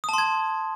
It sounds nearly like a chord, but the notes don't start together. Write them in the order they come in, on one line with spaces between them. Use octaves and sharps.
D#6 A5 C6 G#6